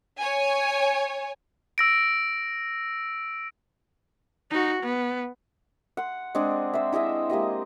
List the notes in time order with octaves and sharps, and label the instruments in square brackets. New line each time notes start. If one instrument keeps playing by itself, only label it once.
[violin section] C#5 G#5
[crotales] E6 A#6 D7
[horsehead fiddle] D#4 F#4
B3
[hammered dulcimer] F#5 C6
G#3 C4 D4
C5 E5
E4 G#4 D#5 E5
G#3 A#3 G4 D#5